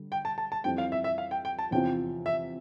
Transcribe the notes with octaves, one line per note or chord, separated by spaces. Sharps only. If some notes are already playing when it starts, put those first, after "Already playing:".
Already playing: D3 G3
G5
A5
A5
A5
F2 E3 G3 C4 G5
F5
E5
E5
F5
G5
G5
A5
E2 C3 F3 C4 F4 G5
E5